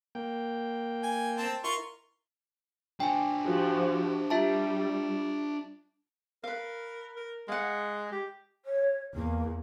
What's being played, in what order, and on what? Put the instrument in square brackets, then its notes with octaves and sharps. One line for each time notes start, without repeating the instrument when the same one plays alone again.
[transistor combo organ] A#3 G5
[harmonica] G#5
C4 A5
[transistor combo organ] E4 A#4 [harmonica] F4 C6 C#6
[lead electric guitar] D4 C5 [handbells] G5 G#5
[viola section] F3 F#4 G4
[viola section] G3 [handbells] F4 E5 A5
[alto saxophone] A#4 [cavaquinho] B4 F5
[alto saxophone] A#4
[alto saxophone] G#3 [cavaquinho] F5 F#5
[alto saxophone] G4
[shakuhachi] C#5
[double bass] E2 [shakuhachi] A#3